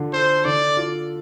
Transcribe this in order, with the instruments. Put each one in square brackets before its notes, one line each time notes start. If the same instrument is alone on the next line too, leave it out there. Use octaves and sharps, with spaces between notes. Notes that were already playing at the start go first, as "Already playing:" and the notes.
Already playing: [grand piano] D3 F4
[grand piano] A4 [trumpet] C5
[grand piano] D3 [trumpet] D5
[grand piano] F4